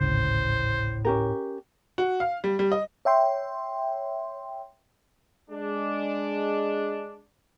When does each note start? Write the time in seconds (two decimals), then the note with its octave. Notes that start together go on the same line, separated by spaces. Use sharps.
0.01 G#1 D2 A2 C#3 C5
1.05 C#4 G4 A#4
1.98 F#4
2.20 F5
2.44 G3
2.59 G3
2.72 D#5
3.05 C#5 E5 G5 C6
5.51 G#3 D4